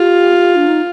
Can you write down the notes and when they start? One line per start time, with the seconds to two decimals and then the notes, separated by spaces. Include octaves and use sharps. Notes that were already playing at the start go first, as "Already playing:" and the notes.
Already playing: F4 G4
0.56 D4
0.68 D#4